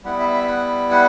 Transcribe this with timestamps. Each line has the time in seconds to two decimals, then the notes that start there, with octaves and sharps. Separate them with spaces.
0.04 G3 B3 E4 F#5
0.20 E5
0.34 E5
0.48 F#5
0.91 F#5